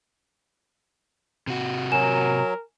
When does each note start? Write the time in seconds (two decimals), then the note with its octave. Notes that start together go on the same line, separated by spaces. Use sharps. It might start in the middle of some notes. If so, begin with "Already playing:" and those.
1.47 C3 F#4
1.92 F#3 A#4 G#5 E7